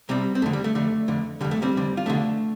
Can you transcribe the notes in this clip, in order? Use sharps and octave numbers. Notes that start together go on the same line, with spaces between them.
C2 C3 G3 C4
C4
F2 D3 A3
G3
A3
F2 D3 A3
F2 D3
F2 D3 G3
A3
G3 C4
F2 D3
F4
F2 D3 A3 D4